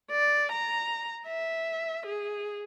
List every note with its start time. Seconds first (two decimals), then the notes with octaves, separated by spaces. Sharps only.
0.11 D5
0.52 A#5
1.27 E5
2.06 G#4